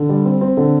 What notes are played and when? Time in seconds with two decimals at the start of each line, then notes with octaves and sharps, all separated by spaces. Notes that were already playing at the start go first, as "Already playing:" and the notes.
Already playing: D3
0.09 G3
0.25 C4
0.41 C4
0.57 D3